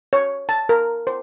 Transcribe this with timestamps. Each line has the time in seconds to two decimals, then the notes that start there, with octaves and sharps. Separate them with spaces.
0.13 C#5
0.49 A5
0.69 A#4
1.07 C5